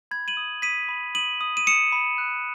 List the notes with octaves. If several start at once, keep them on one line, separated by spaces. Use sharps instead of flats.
B5 G#6
D#7 F#7
D#6
D#6 B6 D#7
B5
D#6 D#7 F#7
D#6
D#7
D#6 C#7 E7
B5
F#6